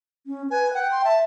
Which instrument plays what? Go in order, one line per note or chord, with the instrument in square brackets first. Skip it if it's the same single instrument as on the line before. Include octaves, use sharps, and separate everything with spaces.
[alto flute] C#4
[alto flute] B4 [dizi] G#5
[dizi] F#5 [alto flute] G5
[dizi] C6
[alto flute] E5 [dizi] A5